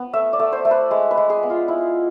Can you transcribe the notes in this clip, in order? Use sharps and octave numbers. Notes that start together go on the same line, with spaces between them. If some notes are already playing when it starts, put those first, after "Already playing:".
Already playing: B3
A3 E5
D5
A3
C5
A3
B4
G#3 B4
B4
G#3
G#4
B3
F4
E4